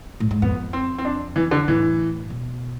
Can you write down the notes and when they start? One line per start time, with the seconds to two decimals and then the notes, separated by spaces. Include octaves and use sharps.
0.20 A2
0.31 G#2
0.42 F2 B3
0.73 C4
0.98 C4
1.05 D4
1.36 E3
1.51 D3
1.68 A2 E3
2.30 B2